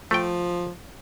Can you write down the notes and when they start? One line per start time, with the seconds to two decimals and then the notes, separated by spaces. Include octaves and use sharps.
0.11 F3 A3 G5